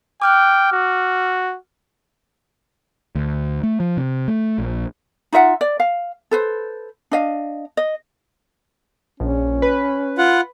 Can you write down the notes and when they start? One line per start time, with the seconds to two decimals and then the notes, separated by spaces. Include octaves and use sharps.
0.22 G5 D6 F6 F#6
0.73 F#4
3.15 D2
3.63 A3
3.80 F3
3.97 C3
4.28 A3
4.58 A#1
5.32 D#4 F4 E5 F#5
5.61 D5
5.80 F5
6.31 A4 B4 C5
7.11 D4 D#5 F5
7.77 D#5
9.20 A#1 C#4
9.62 B4
10.18 F4 F#5